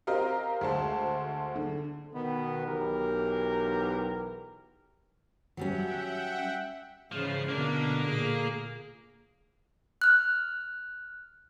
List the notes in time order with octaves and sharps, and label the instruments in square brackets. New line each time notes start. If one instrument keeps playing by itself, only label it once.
[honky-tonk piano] C4 G4 A#4 D#5 F5
D2 G#3 C5 A5
D3
[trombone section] B2 D#3 B3
B1 E3 G4 A#4
[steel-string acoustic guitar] F#3 G3 C#4 [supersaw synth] E5 F#5 G5
[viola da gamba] G#2 C#3 E3 [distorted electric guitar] F3
[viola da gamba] B2 D3 D4 [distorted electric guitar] A#3 A#4
[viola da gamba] A#2 G#4
[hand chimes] F6 F#6